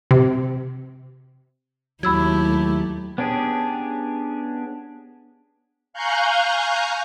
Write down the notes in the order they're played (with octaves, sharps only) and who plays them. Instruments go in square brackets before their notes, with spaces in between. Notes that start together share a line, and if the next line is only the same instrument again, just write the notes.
[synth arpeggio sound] C3
[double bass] D#2 A3 [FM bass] F#3 [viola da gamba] E4 G4 [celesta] B5 E6 G#6
[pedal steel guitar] B3 C#4 D4 G4 G#4
[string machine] F5 G#5 A#5 C#6 F#6 G6